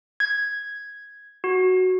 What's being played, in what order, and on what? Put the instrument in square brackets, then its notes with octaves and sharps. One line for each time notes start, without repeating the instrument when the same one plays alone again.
[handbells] G#6
F#4